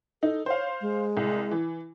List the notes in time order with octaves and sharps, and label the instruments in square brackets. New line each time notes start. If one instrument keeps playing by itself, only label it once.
[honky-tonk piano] D#4 [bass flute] A4
[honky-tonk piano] C5 F5 [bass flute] C#5
[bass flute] G#3
[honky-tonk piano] C2
E3